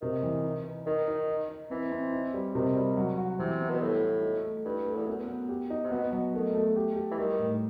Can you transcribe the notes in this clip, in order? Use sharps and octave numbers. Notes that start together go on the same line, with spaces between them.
C3 D#3
E3
D#4
B4
D#3 D#4
D#4
D#4
D#4
E3 C4
C4
D#4
G3
C3 D#3
G3
F#3
F#4
C3 E3
B3
B2
A2 G3
F#4
D#4
A3
G2 E4
A3
E2
F#2 B3
B3
G4
D#4
C3
B2 B3
F#3
D#3 A3
A3
G4
G4
E3
D#3 G3
A2